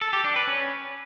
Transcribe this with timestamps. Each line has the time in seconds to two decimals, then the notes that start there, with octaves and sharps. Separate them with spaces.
0.01 A4
0.13 G4
0.24 D4
0.36 B4
0.47 C#4